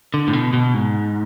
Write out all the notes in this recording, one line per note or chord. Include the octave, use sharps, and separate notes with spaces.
D3
A2
B2
B2
G#2